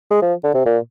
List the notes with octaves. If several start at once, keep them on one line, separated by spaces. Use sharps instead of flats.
G#3
F3
D3
C3
A#2